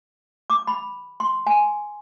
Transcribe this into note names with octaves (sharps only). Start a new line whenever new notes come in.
D6
B5
C6
G#5